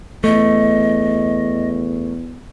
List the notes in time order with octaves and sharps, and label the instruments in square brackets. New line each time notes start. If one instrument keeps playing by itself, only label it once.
[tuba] E2 [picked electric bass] A3 [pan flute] D#5